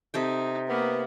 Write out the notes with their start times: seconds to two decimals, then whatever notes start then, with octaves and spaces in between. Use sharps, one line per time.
0.14 C3 D#4 A4 G5
0.69 A#3 B3